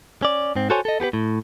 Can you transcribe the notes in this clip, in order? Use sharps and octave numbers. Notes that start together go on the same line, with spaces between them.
C#4 D5
G#2 C4
F#4 A4 C5 C#5 G#5
A4 D#5
B3 G4 G#4 B4
A2